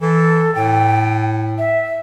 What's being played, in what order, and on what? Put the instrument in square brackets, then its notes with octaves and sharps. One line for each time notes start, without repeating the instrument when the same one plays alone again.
[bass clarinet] E3 [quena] A4
[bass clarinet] A2 [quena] G5
[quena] E5